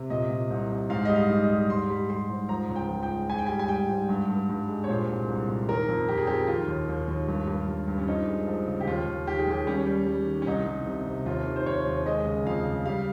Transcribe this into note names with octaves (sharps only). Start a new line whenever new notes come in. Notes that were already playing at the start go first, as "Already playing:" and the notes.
Already playing: C3
A#2 D#5
A#2
C2
C2
G#2 F5
G3 D#5
F5
G#2
D#5
G3
G#2 C6
G3
G3 C6
G#2
F3 A#5
C#2
G5
F3
G5
G#3
G#2 G#5
G5
G3 G#5
G#5
G3 G5
G#2
G2
G2
G2
G#3
C#5
A#2 C5
C2
C2
A#2
D#3 A#4
F2
F2 G4
G#4
F2 G4
D#3 F4
D#2
D#2
D#2
G2
G2
G2
G2
C#4
F3 D#4
G#3
F3
C#3
G4
D#2 F4
D#2
D#3 G4
G#4
D#2 G4
G3 C#4
G3
G3
D#3
C#4
C2 D#4
C2
C3
C3
D#2 F4
D#3
C5
D#2 C#5
D#2
G#3 D#5
C#3
F2 F5
C#3
G3 F5